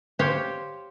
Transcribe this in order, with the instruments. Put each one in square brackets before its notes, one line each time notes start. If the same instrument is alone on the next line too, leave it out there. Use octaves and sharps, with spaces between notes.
[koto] G4 C5 C#5 F5 G5